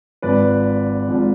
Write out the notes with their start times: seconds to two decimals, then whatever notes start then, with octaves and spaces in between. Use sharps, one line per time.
0.22 G#1 G#2 F3 B4 D5
1.08 G#1 G#2 F3